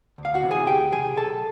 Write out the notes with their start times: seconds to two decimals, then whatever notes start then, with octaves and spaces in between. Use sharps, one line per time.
0.18 D2
0.25 F5
0.34 F#4 F#5
0.43 C3 E3
0.51 G#4 G#5
0.67 D2 G4 G5
0.92 E3 G#4 G#5
0.97 C3
1.17 B1 A4 A5